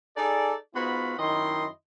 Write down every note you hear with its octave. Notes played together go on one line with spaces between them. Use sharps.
D#4 G#4 A4 D5
G#2 B3 F4 F#4 B5
F#2 D#3 E4 D#5 C6